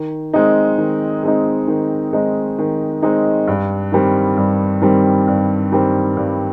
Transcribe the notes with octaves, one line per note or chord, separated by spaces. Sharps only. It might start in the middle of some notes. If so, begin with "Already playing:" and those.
Already playing: D#3
G#3 C4 D#4
D#3
G#3 C4 D#4
D#3
G#3 C4 D#4
D#3
G#3 C4 D#4
G2
D#3 G3 C4
G2
D#3 G3 C4
G2
D#3 G3 C4
G2